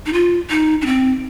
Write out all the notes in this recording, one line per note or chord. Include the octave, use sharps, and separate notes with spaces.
D#4
F4
D#4
D4
C4